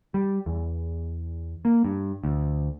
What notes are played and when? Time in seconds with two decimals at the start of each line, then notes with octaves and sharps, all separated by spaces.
0.14 G3
0.46 E2
1.65 A#3
1.85 G2
2.24 D2